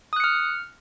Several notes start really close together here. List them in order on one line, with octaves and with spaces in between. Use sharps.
D#6 F#6 C#7 F6